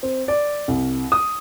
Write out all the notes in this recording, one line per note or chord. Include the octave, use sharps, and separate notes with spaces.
C4
D5
C2
D#6